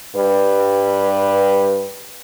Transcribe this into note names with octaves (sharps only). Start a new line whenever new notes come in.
G2 G3 B4